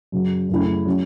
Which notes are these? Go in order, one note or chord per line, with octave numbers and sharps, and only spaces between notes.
F#2 C#3 F#3
F#2 C#3 A3 E4
F#3 C#4